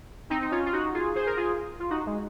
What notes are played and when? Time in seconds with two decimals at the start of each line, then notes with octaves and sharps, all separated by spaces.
0.30 C4 D#4
0.42 D#4
0.51 C#4 F4
0.66 F4
0.73 D#4 F#4
0.94 F4 G#4
1.15 G#4 C5
1.26 A#4
1.37 F4 G#4
1.80 F4
1.90 D#4 F#4
2.06 G#3